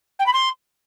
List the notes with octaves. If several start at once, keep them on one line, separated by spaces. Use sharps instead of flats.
G5
B5
C6